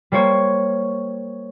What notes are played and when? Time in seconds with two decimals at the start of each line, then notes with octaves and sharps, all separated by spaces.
0.12 G3 A#3 C5 C#5